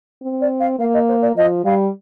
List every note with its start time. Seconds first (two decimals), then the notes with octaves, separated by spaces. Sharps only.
0.22 C4
0.41 D5
0.60 F5
0.79 A#3 F5
0.94 D#5
1.09 C5
1.22 D5
1.36 F3 D#5
1.65 G3 F5